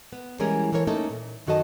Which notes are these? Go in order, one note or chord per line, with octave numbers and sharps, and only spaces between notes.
B3
E3 G3 G#3 C#4 G#4 A#4
E3 A#3 A4 A#4 C#5
A3 A#3 C#4 D#4 A4
A#2
F#2 D#3 F#4 A4 D#5 A5